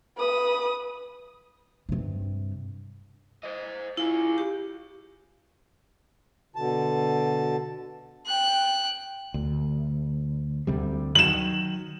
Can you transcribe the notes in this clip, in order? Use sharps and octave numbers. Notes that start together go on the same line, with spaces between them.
B4 D#6
G2 C3
C5 D#5
E4 F4 G#4
G4
B2 D3 A5
G5 F#6
D2
D2 C3 G3
D#3 F#3 E7 F#7